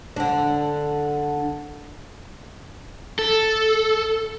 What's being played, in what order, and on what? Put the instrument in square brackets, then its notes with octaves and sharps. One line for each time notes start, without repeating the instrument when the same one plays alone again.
[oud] D3 D4
[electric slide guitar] A4